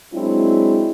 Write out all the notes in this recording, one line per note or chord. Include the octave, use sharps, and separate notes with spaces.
F#3 G#3 C4 D4 E4